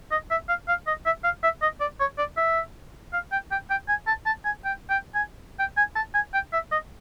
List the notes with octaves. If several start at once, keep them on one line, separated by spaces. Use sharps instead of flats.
D#5
E5
F5
F5
D#5
E5
F5
E5
D#5
D5
C#5
D5
E5
F5
G5
G5
G5
G#5
A5
A5
G#5
G5
G5
G#5
G5
G#5
A5
G#5
G5
E5
D#5